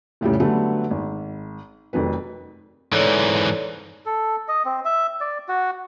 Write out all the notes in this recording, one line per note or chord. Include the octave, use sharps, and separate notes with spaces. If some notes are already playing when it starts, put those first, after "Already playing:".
F1 A2 C#3 G3
D3 F#3 G3 A3 B3
G#1
F1 F2 D#3 F#3 B4
G#2 E3 A4 C#5 D5
A4
D#5
C4
E5
D5
F#4